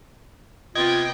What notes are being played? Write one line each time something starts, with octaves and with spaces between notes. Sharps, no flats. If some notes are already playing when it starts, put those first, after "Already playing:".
C3 B3 F4 D#5 G5 G#6